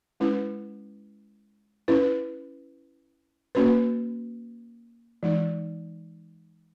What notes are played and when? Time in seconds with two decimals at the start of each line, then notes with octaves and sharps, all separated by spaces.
0.20 G#3 C#4 E4 B4
1.88 C#4 E4 B4
3.55 A#3 C#4 F#4 B4
5.23 E3 G#3 D#4